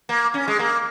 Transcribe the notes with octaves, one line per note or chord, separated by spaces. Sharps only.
A#3
C#4
G#3
A#3